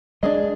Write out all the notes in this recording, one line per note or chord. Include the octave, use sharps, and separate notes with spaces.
G#3 D4 G#4 D#5